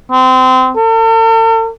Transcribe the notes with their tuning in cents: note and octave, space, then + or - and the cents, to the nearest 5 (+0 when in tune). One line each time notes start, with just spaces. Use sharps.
C4 -25
A4 +45